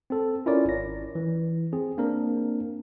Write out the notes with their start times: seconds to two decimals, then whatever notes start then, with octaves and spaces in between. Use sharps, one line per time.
0.10 C4 A4
0.46 C#4 E4 F4 A#4 C#5 D5
0.65 G#1 A#6
1.15 E3
1.73 C4 G#4
1.98 A#3 C4 D4 A#4